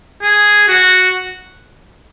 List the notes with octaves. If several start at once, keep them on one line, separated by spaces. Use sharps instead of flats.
G#4
F#4